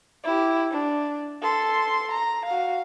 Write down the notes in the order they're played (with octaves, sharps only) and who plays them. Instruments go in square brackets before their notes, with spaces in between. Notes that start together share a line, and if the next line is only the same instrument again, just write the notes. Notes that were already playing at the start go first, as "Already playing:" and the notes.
[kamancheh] E4 G4
D4
A4 C6
A#5
F#4 F5